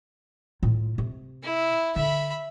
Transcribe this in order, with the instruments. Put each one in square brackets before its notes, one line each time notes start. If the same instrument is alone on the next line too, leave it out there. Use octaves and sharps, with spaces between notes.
[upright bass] A2 F4
C3
[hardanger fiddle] E4
[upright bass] D3 [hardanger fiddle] E5 B5